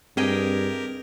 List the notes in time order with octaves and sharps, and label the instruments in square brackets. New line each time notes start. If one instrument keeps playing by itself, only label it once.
[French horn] G2 [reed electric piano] C4 [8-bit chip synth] G4 A#4 [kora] G#4 D#5 G5